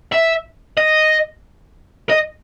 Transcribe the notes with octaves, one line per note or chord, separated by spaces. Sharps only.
E5
D#5
D#5